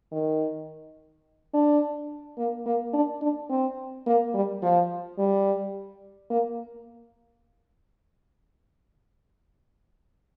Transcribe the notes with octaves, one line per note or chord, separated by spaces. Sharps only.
D#3
D4
A#3
A#3
D4
D4
C4
A#3
G3
F3
G3
A#3